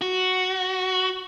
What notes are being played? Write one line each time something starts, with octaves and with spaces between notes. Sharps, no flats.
F#4